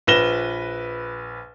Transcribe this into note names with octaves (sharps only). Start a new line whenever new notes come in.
A#1 B4 A#6 E7 G7